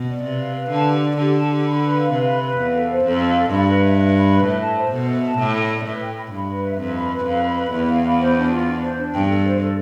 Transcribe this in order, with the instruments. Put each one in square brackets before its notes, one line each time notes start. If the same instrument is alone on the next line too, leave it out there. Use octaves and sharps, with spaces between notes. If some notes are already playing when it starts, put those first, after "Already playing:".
Already playing: [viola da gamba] B2
[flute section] D5
[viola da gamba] C3 [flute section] B4
[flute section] F5
B4
[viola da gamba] D3 [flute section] A5
[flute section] G4
D5
[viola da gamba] D3 [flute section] G4
[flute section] A5
G4
B5
B4
F5
[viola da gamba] C3 [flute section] B4
[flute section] B5
B4
[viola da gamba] E2 [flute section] F5
[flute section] A4
C5
[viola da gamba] F2 [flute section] A4
[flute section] F5
A4
[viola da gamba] G2 [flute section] B5
[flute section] B4
E5
B4
B5
B4
[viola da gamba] A2 [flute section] E5
[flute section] A5
C5
[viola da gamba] B2 [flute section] A4
[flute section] E5
A5
[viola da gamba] A2 [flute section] G5
[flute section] B5
D5
[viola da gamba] A2 [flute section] B4
[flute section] G5
B5
[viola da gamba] G2 [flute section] B5
[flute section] B4
E5
[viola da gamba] F2 [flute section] B4
[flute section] B5
B4
[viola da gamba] F2 [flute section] F5
[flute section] B5
B4
[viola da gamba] E2 [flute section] E4
[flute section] F5
B5
C5
D4
F4
D4
C5
D4
[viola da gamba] G2 [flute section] G5
[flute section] A4
C5
A4